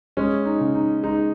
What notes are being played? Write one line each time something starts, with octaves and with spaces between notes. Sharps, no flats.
G#3 C#4
D#4
C#3
D#4
G#3 D#4